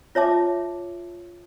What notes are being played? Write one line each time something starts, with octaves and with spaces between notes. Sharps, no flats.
F4 C#5 E5 A5 D6